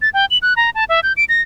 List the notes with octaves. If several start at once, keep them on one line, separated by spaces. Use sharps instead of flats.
A6
G5
F#7
F#6
A#5
A5
E5
G6
D7
A#6